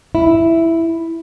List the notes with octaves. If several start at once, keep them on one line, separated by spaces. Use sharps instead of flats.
E4